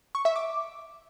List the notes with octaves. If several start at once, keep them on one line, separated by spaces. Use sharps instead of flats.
C#6
E5
D6